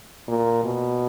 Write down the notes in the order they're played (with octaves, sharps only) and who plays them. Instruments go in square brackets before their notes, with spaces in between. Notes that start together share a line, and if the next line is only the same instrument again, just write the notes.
[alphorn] A#2
B2